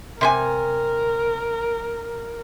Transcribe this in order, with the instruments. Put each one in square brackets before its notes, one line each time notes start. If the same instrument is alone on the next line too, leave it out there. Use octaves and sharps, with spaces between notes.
[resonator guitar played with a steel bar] C3 C5 G#5 [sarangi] A#4